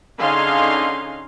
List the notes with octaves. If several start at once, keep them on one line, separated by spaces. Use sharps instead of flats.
D3 C#4 D#4 G#4 F5 C6